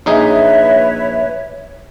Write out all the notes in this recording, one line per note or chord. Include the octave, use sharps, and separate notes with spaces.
A#1 D#4 G#4 B4 C#5 E5